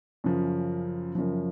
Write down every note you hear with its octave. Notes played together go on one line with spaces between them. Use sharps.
F#2 C#3 F3
F#2 C#3 F3